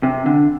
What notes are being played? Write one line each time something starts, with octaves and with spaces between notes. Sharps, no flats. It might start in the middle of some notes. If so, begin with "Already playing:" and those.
C3
D3